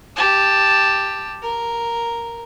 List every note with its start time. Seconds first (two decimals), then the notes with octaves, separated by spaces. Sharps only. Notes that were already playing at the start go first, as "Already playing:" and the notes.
0.16 G4 A5
1.43 A#4